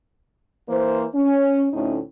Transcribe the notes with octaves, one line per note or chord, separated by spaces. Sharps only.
E3 A#3 C5
C#4
D2 A2 C#4 D#4